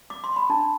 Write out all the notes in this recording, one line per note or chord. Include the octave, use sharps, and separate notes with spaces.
D6
C6
B5
D4 A5